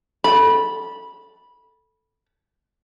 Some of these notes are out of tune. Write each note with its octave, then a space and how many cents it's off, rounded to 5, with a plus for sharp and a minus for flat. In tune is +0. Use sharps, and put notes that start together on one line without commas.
A4 +0 B5 -15